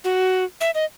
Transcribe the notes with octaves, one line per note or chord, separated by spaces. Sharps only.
F#4
E5
D#5